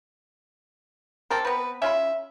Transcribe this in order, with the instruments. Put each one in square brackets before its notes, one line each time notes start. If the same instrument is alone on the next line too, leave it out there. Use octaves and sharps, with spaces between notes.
[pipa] C4 G4 A4 [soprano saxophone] A#4
[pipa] B3 C4 [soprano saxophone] B4
[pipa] C#4 F4 B5 [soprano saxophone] E5